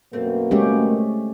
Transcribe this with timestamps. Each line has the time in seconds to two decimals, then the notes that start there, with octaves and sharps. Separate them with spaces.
0.13 F#2 B2 A3 A#3 C4
0.51 G#3 A3 C4 C#4 G4 G#4